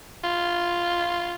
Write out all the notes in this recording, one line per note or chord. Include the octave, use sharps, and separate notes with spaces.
F4